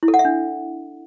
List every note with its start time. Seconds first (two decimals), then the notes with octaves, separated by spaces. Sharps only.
0.03 E4
0.08 A4
0.14 F#5
0.19 E5
0.25 D4